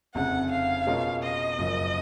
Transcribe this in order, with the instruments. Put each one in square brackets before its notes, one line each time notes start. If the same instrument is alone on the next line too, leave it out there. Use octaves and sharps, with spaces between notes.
[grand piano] F1 F2 C#3 [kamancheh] F#5
[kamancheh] F5
[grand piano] B2 G#3 C#4 F4 A#4
[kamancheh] D#5
[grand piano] F#1 F#2 F3